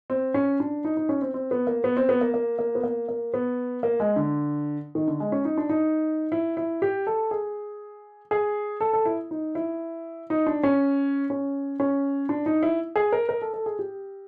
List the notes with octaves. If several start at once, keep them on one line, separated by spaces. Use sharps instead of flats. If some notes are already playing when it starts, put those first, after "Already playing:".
C4
C#4
D4
D#4
D#4
C#4
C4
C4
B3
A#3
B3
C4
B3
A#3
A#3
A#3
B3
A#3
A#3
B3
A#3
G#3
D3
D#3
D3
G#3
C#4
D#4
D4
D#4
E4
E4
G4
A4
G#4
G#4
A4
A4
E4
D#4
E4
D#4
D4
C#4
C#4
C#4
D4
D#4
E4
G#4
A#4
A#4
A4
A4
G#4
G4